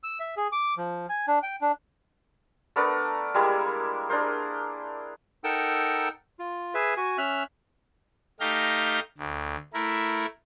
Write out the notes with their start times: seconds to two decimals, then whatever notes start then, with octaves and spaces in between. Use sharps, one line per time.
0.03 E6
0.20 E5
0.37 G#4
0.52 D6
0.77 F3
1.09 G#5
1.28 D4
1.43 G5
1.61 D4
2.76 A3 B3 D4 A#4
3.34 G3 G#3 A#3 E4
4.09 D4 G#4 A#4 C5
5.44 D#4 A4 A#4 F#5 G5 E6
6.39 F4
6.74 G#4 B4 E5
6.97 F#4 G#5
7.18 C#4 E5 F6 F#6
8.40 A3 D#4 G4 F5 G6 A#6
9.18 D2
9.74 A3 E4 A#4